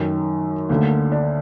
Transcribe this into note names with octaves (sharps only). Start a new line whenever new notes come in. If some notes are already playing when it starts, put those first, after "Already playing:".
Already playing: F#2 D#3 A3
D2 D3 A#3
D4